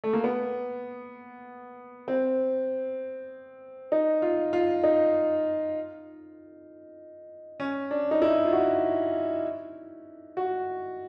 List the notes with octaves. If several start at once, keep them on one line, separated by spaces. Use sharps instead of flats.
A3
A#3
B3
C4
D#4
F4
F4
D#4
C#4
D4
D#4
E4
F4
F#4
F#4